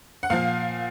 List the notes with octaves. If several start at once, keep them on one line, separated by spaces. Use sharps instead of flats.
F#5
A#2 F3 F5